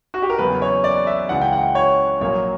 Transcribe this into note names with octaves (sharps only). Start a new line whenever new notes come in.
F#4
G4
A#4
E2 C#3 F#3 A#3 B4
C#5
D5
E5
C#2 C#3 E3 F#5
G5
F#5
C#5
A#1 A#2 F#3 A#3 C#5